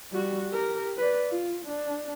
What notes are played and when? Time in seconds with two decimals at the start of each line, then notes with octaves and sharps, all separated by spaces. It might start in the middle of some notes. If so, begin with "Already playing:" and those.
0.12 G3 F#4
0.51 G4 A#4
0.97 B4 D5
1.31 F4
1.65 D4